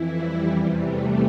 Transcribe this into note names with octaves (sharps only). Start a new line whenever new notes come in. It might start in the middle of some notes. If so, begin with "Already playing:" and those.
Already playing: F2 E3 E4
G3
E2 C3 E3 G3
A3